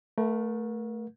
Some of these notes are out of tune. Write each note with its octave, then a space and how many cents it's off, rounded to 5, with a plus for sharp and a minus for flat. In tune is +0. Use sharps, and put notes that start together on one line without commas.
A3 +0 A#4 +40 F#5 -45